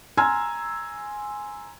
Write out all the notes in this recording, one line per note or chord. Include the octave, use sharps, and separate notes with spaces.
G#5 A#5 C6 E6 F6 G#6